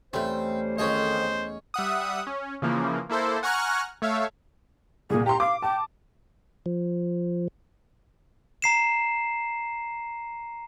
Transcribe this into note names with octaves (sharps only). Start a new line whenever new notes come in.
E2 G3 A3 C4 C#4 C5
F2 D#3 C#4 G#4 C5 D#5
G3 E5 F#5 D#6
C#4
C#3 E3 F3 A#3
A#3 E4 A4 C5
F#5 G#5 A#5 C#6 F6 F#6
A3 C#5 E5 F5
C2 A#2 G#4
G4 A#5 C6
F5 D6
G5 A5
F3
A#5 C7 E7